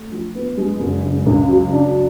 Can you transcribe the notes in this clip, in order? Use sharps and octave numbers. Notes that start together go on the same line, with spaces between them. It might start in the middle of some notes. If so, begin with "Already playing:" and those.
Already playing: A3
F3
B3
G#3
F#1
C#3
C#2
F#3
D4